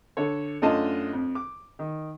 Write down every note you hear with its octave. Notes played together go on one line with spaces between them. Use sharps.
D3 A4 C#5
F#2 A3 D4 F4 D#5 A5
F2
D6
D#3